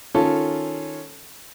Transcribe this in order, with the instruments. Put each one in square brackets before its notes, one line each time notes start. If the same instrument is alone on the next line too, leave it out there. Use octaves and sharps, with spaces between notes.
[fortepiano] D#3 C#4 F4 A4